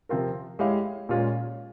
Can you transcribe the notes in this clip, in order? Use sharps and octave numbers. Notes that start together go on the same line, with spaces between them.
C3 F3 C4 F4 A#4
G#3 E4 G4 C#5 F5
A#2 G#3 C#4 F4